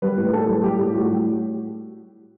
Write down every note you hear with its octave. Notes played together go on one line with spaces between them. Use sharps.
G3 B4
A2
A2 A4
G3
G3 G4
A2 G4
A2 F#4
G3